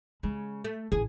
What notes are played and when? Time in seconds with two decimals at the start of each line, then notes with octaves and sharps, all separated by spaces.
0.23 C#3 G#3
0.64 A3
0.92 A1 G#4